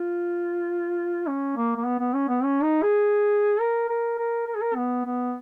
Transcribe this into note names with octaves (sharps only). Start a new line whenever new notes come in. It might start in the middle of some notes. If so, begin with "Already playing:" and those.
Already playing: F4
C#4
A#3
A#3
B3
B3
C#4
B3
C#4
D#4
G#4
A#4
A#4
A#4
A#4
G#4
A#4
B3
B3